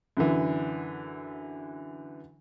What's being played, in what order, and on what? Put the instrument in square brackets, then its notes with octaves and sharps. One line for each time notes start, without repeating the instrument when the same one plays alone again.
[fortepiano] F#2 D3 E3